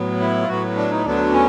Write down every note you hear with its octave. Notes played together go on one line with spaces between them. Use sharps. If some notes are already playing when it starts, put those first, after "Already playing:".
Already playing: A2 F#3 B3
E4
F4
A2 F#3 B3 F#4
D4
D#4
D2 D3 F#3 B3 D4
C#4